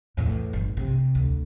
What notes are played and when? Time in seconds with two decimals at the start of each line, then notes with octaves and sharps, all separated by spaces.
0.17 E2 A2
0.53 G1
0.77 C3
1.15 D2